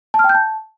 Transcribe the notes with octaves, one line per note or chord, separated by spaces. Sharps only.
A5
F6
G5
G6
A5